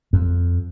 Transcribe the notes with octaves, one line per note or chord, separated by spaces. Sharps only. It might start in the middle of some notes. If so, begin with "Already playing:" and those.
F2